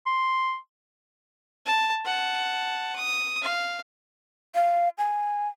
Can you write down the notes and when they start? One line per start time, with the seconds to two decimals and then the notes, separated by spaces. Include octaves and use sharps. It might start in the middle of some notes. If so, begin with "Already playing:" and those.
0.06 C6
1.66 A5
2.06 F#5 A5
2.96 D#6
3.42 F5
4.55 F5
4.98 G#5